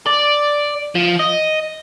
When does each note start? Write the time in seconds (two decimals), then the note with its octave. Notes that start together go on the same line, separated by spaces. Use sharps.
0.06 D5
0.95 F3
1.20 D#5